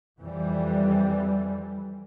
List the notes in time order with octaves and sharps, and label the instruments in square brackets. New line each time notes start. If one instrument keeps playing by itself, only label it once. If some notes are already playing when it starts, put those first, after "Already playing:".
[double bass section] F2 E3 G3